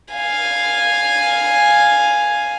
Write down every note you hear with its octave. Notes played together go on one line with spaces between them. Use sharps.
F5 G#5